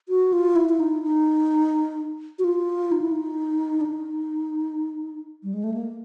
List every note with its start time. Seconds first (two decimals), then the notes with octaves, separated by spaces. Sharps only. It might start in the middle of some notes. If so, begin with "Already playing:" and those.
0.09 F#4
0.33 F4
0.56 E4
0.69 E4
0.80 D#4
1.03 D#4
2.39 F#4
2.44 F4
2.92 D#4
3.01 E4
3.12 D#4
3.81 D4
3.85 D#4
5.43 G3
5.54 G#3
5.64 A3
5.74 A#3